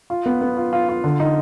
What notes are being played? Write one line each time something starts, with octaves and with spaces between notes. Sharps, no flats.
F4
B3
B3
F4
F4
F4
D3
D#4